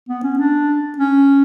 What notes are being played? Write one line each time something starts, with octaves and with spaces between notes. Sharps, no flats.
B3
C#4
D4
C#4